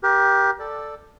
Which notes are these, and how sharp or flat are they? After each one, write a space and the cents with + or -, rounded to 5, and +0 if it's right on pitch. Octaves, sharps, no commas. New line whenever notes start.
G4 +0 A#4 +35
A4 +0 D5 +5